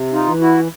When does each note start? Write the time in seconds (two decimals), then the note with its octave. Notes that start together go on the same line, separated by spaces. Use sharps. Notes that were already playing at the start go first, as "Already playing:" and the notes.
Already playing: C3
0.13 D#4 F4
0.26 E3
0.40 E4 F#4